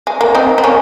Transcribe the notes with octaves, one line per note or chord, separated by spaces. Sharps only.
G#3
A#3
C4 D#4
C4
A#3 C#4